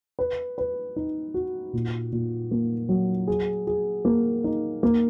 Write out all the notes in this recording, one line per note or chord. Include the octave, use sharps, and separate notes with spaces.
B4
B4
D#4
F#4
A#2
A#2
A#3
F#3
G#4
G#4
A#3
D#4
A#3